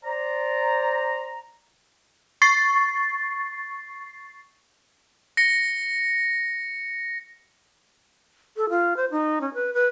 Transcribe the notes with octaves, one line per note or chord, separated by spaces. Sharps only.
C5 D5 A#5
C#6 A6 C7
A#6 C#7
A4
F4
C5
D#4
C#4
B4
B4